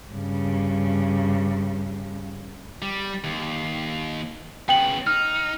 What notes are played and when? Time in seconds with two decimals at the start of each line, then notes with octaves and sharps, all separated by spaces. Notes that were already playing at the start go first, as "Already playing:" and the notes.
0.12 G2 C#3
2.82 G3
3.24 D#2
4.69 C#3 B3 G5 F#7
5.07 D#4 F6